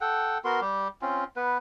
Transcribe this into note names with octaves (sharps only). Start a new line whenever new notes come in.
A4 F#5 G5
B3 F#4 A#4 C6
G3 G4
C4 C#4 F4
B3 B4